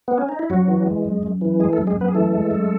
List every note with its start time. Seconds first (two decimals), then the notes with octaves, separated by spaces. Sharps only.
0.08 B3
0.18 C#4
0.29 D#4
0.39 E4
0.50 F#2 F#3 F#4
0.68 E3
0.87 G#3
1.05 F#2
1.23 F#2
1.41 E3
1.60 G#3 G#4
1.73 A3 A4
1.78 F#2
1.87 G#3 G#4
1.96 F#2 B3 B4
2.08 G#4
2.14 E3 A3 A4
2.33 G#3
2.51 F#2